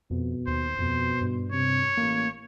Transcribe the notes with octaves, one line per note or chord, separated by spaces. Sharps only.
F2 B2
D#2 C5
F2 B2
G2
C3 C#5
A1 A#3